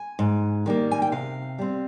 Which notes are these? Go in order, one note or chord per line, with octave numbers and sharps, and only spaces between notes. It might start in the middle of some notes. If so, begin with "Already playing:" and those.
Already playing: G#5
G#2
D#3 G3 A#3
G#5
G5
C3 F5
G3 C4